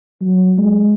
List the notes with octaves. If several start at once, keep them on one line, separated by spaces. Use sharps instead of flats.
F#3
G#3